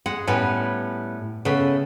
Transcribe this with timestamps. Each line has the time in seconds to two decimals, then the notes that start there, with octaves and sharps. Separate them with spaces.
0.06 G#3 F#5
0.27 A2 G3 B3 C#4
1.45 C#3 A3 B3